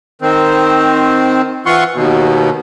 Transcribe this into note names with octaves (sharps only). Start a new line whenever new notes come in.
D#3 C4
E3 F4 F#5 C6 C#6
D#2 B2